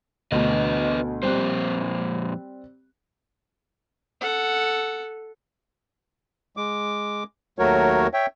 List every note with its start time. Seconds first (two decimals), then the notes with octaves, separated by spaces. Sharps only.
0.32 D2 B2 D4 B4 D#5
1.23 F2 A#2 G3 C4 C5 F#6
4.21 A4 F#5
6.57 G#3 D6
7.59 D#2 F#3 A3 F#4 A#4 C#5
8.13 C#5 E5 G5